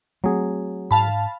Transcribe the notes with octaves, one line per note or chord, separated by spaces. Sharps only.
F#3 A3 C4 G#4
G#2 F5 A5 B5